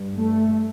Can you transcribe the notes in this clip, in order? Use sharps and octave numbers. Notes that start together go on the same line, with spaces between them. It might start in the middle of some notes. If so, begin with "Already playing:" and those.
Already playing: G2
A3